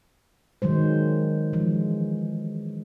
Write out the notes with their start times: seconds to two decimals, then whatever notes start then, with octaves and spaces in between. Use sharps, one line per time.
0.62 D#3 F#3 G#3 C5
1.53 E3 F3 G#3